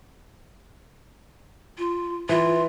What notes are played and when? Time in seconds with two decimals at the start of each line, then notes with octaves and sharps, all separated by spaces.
1.78 F4
2.29 E3 F4